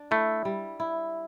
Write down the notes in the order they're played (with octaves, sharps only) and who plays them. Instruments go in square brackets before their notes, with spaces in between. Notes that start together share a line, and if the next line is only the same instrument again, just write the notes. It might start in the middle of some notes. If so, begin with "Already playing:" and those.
Already playing: [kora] D4
[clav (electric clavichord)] A3 [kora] E4
[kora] G3
E4